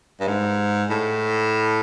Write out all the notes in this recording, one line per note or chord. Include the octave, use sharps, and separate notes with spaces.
G2
G#2
A2